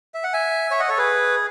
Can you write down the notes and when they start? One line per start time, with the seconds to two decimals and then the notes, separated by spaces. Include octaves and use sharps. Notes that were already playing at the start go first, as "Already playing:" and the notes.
0.14 E5
0.24 F#5
0.34 E5 G#5
0.71 C#5 E5
0.79 D#5 F#5
0.89 A4 C#5
0.98 G#4 B4